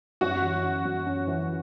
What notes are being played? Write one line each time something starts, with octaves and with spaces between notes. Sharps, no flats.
F#2 F#4
E3
C#4
F#2
C#4
E3